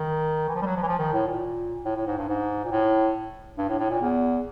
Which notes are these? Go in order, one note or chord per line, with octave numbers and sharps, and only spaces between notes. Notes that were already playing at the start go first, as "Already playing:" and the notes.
Already playing: D#3
E3
F3
G3
F#3
F3
E3
F3
D#3
A2
A#2
A2
A2
G#2
G2
G#2
A#2
A2
G2
A2
A2
A#2
E2